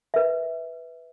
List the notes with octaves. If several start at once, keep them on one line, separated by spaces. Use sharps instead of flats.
B4 E5